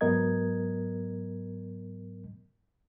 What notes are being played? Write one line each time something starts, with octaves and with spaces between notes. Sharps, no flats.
G#2 F#3 B3 A#4 D#5 G#6